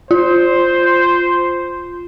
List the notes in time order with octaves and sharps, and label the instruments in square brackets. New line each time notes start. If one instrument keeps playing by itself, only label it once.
[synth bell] F4 [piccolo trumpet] C5